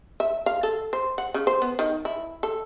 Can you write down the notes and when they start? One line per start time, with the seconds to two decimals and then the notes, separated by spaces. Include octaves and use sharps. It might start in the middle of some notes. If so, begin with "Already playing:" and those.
0.20 E5
0.46 F5
0.63 A4
0.93 C5
1.18 F#5
1.34 C#3
1.47 C5
1.62 B3
1.79 D#3
2.05 E4
2.43 A4